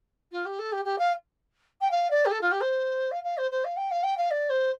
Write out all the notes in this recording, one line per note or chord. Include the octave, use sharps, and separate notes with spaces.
F4
G4
A4
G4
G4
F5
G5
F5
D5
G4
A4
F4
G4
C5
F5
F5
C5
C5
F5
G5
F5
G5
F5
D5
C5